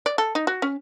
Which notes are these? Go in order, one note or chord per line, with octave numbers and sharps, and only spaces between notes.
D5
A4
D#4
F#4
C#4